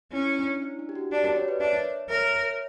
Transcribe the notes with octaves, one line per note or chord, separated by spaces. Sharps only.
C#4 E4
D4
E4
D4
G4
F#4
D4 G4
F#4 A#4
A#4 C#5
B4 D5
D4 C#5 E5
A#4 C#5 E5